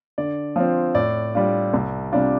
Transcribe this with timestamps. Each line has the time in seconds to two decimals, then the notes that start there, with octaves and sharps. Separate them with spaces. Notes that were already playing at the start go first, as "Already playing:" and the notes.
0.18 D3 D5
0.56 F3 C4
0.95 A2 D5
1.35 G3 D4 F4
1.74 C2
2.12 C3 G3 D4 F4